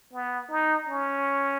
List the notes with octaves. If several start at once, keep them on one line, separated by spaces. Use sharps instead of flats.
B3
D#4
C#4